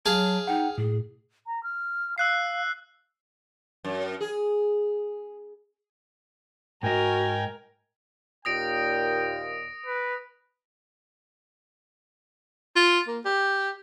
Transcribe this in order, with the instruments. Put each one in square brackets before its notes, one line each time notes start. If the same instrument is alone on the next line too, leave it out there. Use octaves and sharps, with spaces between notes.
[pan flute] F#3 [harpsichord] G#4 F5 [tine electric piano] A5
[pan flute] D#4 [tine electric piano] F#5 G5
[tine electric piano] A2 [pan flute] G#4
[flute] A#5
F6
[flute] F5 [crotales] E6 F#6 C7
[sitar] F#2
G#4
[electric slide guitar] G#2 D#5 [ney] F#4 [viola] A#4 [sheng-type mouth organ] G5 G#5
[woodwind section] D#2 A#2 [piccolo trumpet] G5 [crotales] D#6 A#6 D7
[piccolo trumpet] B4
[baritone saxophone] F4
A#3
G4